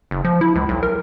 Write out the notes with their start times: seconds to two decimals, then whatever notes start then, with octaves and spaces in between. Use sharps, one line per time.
0.11 F#1
0.25 F3
0.41 E4
0.56 C#2
0.69 B1
0.83 A#4